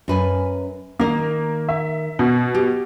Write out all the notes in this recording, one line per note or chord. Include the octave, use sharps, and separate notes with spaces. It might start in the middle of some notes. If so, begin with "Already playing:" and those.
F#2 B4 G#5
D#3 A#3 A#4
E5
B2
G4